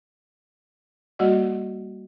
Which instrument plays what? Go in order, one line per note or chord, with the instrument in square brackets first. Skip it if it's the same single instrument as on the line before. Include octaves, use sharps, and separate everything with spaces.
[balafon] G3 A#3 F#4 D5 D#5 F#5